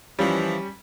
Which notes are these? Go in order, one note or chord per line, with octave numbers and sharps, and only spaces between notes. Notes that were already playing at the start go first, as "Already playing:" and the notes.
E3 F3 G3 C#4